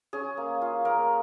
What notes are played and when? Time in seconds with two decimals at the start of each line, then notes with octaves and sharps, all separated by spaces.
0.13 C#4 G#4
0.37 A#3
0.62 F4
0.85 A#3 A#4